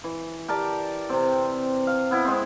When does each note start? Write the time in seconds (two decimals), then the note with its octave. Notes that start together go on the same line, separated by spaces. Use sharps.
0.04 E3
0.48 G4 A#4 D5 A5
1.10 C3 C4
1.87 F5
2.11 B3 E4
2.25 G#3 C4